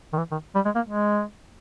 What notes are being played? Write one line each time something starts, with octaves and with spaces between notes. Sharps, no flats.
D#3
E3
D#3
G3
G#3
A#3
G#3